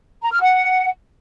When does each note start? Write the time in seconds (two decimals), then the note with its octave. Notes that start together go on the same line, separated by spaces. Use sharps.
0.23 A#5
0.32 F6
0.42 F#5